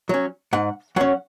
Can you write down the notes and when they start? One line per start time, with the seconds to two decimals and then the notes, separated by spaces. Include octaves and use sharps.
0.09 F#3 C#4
0.53 G#2 F#5
0.96 F#3 C#4 F#5